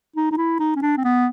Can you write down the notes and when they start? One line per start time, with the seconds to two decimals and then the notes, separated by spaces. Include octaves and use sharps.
0.16 D#4
0.31 D#4
0.37 E4
0.59 D#4
0.76 C#4
0.82 D4
0.97 C4
1.04 B3